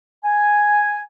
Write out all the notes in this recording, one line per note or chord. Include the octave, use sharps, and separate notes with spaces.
G#5